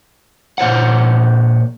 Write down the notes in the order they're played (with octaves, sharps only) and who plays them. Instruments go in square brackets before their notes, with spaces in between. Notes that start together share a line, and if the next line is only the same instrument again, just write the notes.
[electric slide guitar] A#2 C5 C#5 F#5